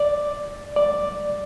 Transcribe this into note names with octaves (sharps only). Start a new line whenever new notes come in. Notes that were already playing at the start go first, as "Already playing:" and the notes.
Already playing: D5
D5